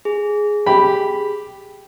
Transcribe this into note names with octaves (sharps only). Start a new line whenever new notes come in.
G#4
G4 B5